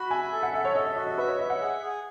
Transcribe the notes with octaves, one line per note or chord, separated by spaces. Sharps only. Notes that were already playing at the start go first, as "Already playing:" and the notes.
Already playing: F#4 B5
E5 G#5
A4
F#5
A4 E5
C#5
A4 D#5
E5
F#4 D#5
D#5
B4 E5
C#5
D#5 E5
F#5
G#4
G#4